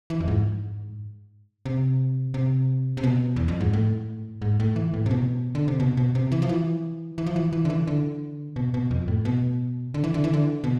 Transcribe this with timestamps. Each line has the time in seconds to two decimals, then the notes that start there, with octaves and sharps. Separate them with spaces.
0.10 E3
0.20 F2
0.28 G#2
1.66 C3
2.34 C3
2.97 C3
3.03 B2
3.36 E2
3.48 F2
3.61 G#2
3.73 A2
4.42 G#2
4.60 A2
4.76 E3
4.94 A2
5.06 C3
5.11 B2
5.55 D3
5.68 C3
5.80 B2
5.97 B2
6.15 C3
6.32 E3
6.42 F3
6.49 E3
7.18 E3
7.26 F3
7.36 E3
7.53 E3
7.65 D3
7.70 E3
7.87 D3
8.56 B2
8.74 B2
8.91 F2
9.08 A2
9.25 B2
9.94 D3
10.04 E3
10.14 D3
10.24 E3
10.33 D3
10.64 B2